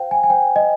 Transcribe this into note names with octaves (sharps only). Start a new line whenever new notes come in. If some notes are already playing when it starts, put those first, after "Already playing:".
Already playing: F4 C5 F5 G5
G#5
G#5
C5 G5
D#5